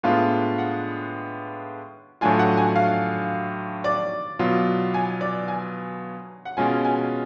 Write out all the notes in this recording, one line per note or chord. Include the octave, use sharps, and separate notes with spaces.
A2 G#3 B3 D4 F4 F5
F#5
A2 F#3 A3 D4 F4 G#5
F#5
G#5
F5
D5
B2 F#3 B3 F4
G#5
D5
G#5
F#5
B2 G#3 C#4 F4 G#5
G#5